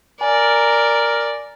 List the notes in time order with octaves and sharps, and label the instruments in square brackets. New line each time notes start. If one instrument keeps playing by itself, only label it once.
[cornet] A#4 [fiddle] D5 [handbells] G#5